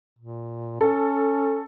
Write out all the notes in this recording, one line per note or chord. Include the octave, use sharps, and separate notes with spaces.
A#2
C#4 A4